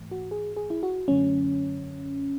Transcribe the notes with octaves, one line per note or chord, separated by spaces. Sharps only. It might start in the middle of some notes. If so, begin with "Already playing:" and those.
Already playing: G#2 E3 A3
F#4
G#4
G#4
E4
F#4
F#2 D3 F#3 A3 C#4